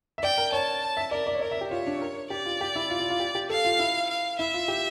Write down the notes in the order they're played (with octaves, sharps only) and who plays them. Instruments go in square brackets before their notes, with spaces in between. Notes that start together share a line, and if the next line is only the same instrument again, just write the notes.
[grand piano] E5
[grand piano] D5 [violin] G5
[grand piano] A#4
[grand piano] C#5 [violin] A5
[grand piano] E5
[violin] A#4 [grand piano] D5
[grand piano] D5
C#5
[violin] A#4 [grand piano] D5
[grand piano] E5
G4
[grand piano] F4 [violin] C#5
[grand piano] D4
A#4
[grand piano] G4 [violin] D5
[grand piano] F4
G4
E4
F4
F4
F4
G4
G4
[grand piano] A4 [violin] F5
[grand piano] F4
E4
[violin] F5
[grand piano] E4 [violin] E5
[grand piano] F4
G4